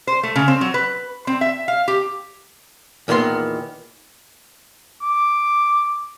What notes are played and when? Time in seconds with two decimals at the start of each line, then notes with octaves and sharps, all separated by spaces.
0.07 C5
0.23 A3
0.36 C#3
0.48 C4
0.61 F#3
0.74 B4
1.27 C4
1.41 E5
1.68 F5
1.88 G4
3.08 E2 A#2 D#3 B3 C6
5.02 D6